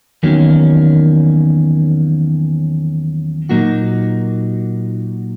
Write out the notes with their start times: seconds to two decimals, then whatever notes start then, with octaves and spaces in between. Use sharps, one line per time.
0.23 E2 D#3 F#3 A#3 C#4
3.49 A#2 F#3 A#3 D#4 F#4